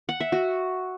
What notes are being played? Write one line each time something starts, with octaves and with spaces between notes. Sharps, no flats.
F#5
E5
F#4